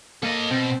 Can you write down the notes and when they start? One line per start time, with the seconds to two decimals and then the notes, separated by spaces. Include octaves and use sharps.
0.23 A#3 A4 D#5
0.51 B2 C4